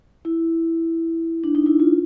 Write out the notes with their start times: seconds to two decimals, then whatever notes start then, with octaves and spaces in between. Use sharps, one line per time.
0.25 E4
1.44 D4
1.55 D#4
1.66 E4
1.80 F4